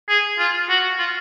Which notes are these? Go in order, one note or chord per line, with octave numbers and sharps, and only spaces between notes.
G#4
F4
F#4
F4